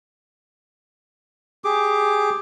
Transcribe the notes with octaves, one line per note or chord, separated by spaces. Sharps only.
G4 G#4 D6